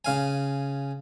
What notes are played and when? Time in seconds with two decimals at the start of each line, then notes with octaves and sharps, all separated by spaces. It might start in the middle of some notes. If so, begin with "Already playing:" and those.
0.05 C#3 F5 G#5